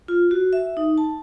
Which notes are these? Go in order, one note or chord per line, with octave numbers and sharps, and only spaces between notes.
F4
F#4
E5
D#4
A5